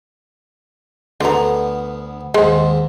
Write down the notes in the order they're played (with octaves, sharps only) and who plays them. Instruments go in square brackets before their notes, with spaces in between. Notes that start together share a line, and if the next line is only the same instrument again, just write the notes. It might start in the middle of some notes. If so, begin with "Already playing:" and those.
[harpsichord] D2 B3 [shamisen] D3 A#5
[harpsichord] D#2 G#2 [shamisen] G#3